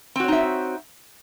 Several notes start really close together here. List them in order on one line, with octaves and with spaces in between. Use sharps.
C4 F#4 C#5 D#4 E5